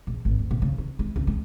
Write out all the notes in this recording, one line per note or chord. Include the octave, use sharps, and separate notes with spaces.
A#1
G#1
D2
A#2
C#3
C#4
G#3
C#2
G#3